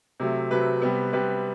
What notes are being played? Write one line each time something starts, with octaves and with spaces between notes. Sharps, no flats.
C3 F#3 A3
C3 F#3 A3 B4
C3 G3 B3
C3 G3 B3 B4